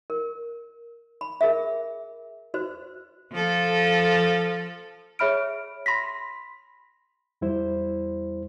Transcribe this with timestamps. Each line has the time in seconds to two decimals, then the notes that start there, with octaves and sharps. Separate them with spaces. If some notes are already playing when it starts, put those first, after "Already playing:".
0.10 A#4
1.21 B5
1.41 G#4 A#4 E5
2.54 F#4 B4 C5
3.32 F3 A4
5.19 G#4 C#5 E5 B5 F6 D7
5.86 B5 C6 A#6 B6
7.41 E2 G3 E4 C5